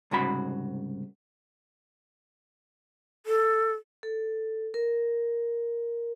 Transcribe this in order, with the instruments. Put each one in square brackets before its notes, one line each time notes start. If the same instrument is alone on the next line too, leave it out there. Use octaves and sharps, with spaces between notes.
[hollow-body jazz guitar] C2 G#2 C#3 F#4 B5
[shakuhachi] A4
[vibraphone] A4
A#4